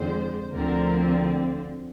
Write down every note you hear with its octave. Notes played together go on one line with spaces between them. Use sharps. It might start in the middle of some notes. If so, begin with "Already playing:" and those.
Already playing: F2 D3 G#3 C4 C5
D2 D3 F3 C4 A#4